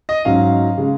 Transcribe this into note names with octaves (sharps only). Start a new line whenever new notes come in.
D#5
G#2 F#3 C#4 F5
C#3 G#3